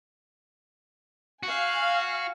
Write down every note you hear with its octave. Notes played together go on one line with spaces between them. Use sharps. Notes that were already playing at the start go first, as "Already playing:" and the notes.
F#4 F5 G#5